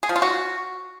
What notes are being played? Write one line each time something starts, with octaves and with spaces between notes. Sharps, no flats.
G#4
F3
F4
F#4